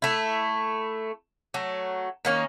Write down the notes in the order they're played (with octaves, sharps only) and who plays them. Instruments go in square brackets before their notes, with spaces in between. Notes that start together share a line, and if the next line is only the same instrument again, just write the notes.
[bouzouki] A3 E4
F#3 A3
D#3 A#3 C#4